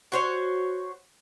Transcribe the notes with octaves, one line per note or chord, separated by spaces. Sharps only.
F#4 C5 C#5